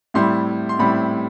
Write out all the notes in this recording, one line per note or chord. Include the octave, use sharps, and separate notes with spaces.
A2 G3 C4 E4 C6
C6
A2 G3 C4 E4 B5